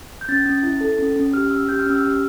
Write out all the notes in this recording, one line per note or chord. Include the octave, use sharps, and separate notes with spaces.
G6
C#4 A6
C#4
E4
A4
C#4
C#4
G4 F6
C#4 E6
G4 G6
F6
C#4 E6
G4 F6